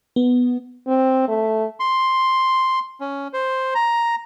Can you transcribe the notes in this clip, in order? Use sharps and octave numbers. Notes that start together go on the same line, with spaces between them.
B3
C4
A3
C6
C#4
C5
A#5